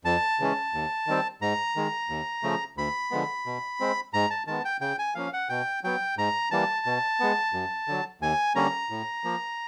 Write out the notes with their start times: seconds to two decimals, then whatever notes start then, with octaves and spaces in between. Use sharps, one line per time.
0.05 F2 A5
0.40 C#3 E3 G#3 C#4
0.74 D#2
1.07 D#3 G3 C4
1.41 G#2 A#5
1.76 D#3 G#3
2.09 D#2
2.43 C#3 F3 A3
2.77 D2 B5
3.11 D3 F3 G#3 B3
3.46 B2
3.80 G#3 C4
4.13 G#2 A#5
4.30 A5
4.47 D#3 G#3 B3 A5
4.65 G5
4.81 C#3 G5
4.99 G#5
5.15 F3 A#3 C#4 F5
5.33 F#5
5.49 B2 G5
5.84 F#3 B3 G5
6.17 G#2 A#5
6.51 E3 G3 A#3 A5
6.86 B2
7.20 G#3 B3
7.53 F#2
7.88 D3 F#3
8.21 D#2 G#5
8.55 D3 G3 A#3 C#4 A#5
8.90 A2
9.24 F3 A#3